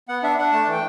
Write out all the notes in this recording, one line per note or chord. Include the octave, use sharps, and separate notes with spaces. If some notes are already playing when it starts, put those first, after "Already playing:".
B3 F#5
D4 E5
D4 F#5
A3 A5
E3 G5